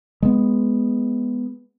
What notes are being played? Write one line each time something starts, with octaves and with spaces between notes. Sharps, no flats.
G#3 B3